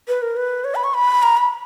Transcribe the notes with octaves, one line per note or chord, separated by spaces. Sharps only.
B4
A#4
B4
C#5
B5
C#6
B5
A#5
B5